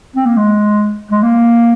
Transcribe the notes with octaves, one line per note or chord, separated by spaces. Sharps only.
C4
A#3
G#3
G#3
A#3